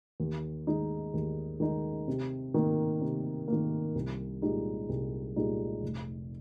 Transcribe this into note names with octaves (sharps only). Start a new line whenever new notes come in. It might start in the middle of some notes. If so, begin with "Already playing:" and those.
D#2
D#3 G#3 D#4
D#2
D#3 G#3 D#4
C3
D#3 A#3
C3
D#3 A#3
C2
A#2 G#3 D#4 G4
C2
A#2 G#3 D#4 G4
F1